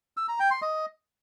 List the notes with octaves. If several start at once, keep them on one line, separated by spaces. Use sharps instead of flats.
E6
A#5
G5
C6
D#5